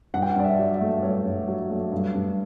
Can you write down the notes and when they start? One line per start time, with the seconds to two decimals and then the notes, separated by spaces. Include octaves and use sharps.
0.14 G2 F#5
0.22 G5
0.30 F#5
0.36 G2 D5
0.44 E5
0.58 F#3
0.74 E5
0.81 A3
1.03 G2 C#5
1.26 G2
1.48 F#3
1.70 A3
1.92 G2
2.14 G2